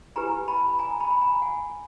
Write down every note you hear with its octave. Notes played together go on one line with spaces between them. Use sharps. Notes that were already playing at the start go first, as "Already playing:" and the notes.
E4 G4 B4 G#5 A#5
A5 B5
G#5 A#5
A5 B5
B5
G#5 A#5
F#5 G#5